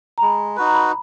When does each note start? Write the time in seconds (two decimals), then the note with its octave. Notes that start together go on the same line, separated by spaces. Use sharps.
0.18 A#5
0.22 G#3 B5
0.57 D#4 F#4 B4 B5
0.66 A#5
0.74 B5